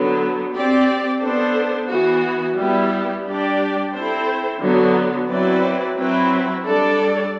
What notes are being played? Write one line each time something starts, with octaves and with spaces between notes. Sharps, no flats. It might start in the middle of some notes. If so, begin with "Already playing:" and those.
Already playing: D3 F#3 B3
C4 G4 D5
B3 D4 A4 C5
E3 B3 F#4
G3 B3 E4 G4
G3 D4 G4 D5
C4 E4 A4 C5
D3 F#3 B3 F#4
F#3 C4 E4 B4 D5
F#3 C4 E4 B4
G3 D4 A4 D5